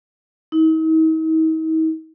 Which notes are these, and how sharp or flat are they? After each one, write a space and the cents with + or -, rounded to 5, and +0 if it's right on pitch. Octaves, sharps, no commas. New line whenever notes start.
D#4 +45